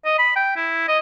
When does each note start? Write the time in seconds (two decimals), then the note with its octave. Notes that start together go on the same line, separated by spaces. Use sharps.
0.05 D#5
0.19 B5
0.36 G5
0.56 E4
0.88 D#5